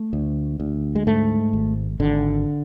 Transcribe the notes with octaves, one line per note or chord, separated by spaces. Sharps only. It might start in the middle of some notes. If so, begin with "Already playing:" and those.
Already playing: A3
D2
D2
G#3
G#2 A3
G#1
G#1 D3